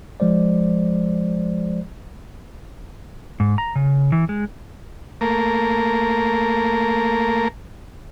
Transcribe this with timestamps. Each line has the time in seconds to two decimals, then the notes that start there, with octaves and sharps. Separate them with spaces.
0.20 F3 G#3 C5 D5
3.40 G#2
3.58 A#5
3.76 C#3
4.12 E3
4.29 G#3
5.21 A3 A#3 A#4